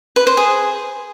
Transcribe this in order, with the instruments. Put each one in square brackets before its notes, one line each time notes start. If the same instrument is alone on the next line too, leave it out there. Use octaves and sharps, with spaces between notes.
[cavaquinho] B4
C5
G#4